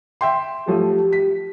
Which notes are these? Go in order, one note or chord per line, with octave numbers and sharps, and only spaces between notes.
E5 G5 C6
F3 F#3 A3 G4
B6